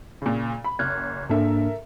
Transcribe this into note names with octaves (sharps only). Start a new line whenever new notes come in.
A#2 C#3
B5
F#1 F6 F#6 G#6
G#2 A#3 D4 A4 A#4 E5